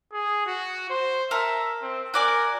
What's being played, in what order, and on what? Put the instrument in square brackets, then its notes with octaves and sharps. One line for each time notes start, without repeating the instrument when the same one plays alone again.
[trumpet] G#4
F#4
C5
[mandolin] A4 A#4 [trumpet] E5
[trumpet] C4
[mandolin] F#4 D5 G#5 [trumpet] A#4